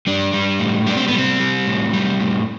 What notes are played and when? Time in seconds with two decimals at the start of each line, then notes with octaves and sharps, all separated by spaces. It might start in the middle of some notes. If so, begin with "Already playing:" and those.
0.07 G3 D4
0.33 G3
0.59 A2
0.87 G3 D4
0.97 C4
1.08 B3
1.13 G3 C4
1.40 G3
1.67 A2
1.93 G3
2.20 A2